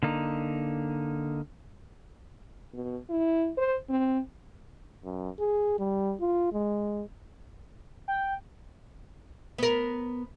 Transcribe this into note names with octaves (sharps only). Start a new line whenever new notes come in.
D3 A#3 D#4
B2
E4
C5
C4
F#2
G#4
G3
F4
G#3
G5
B3 A#4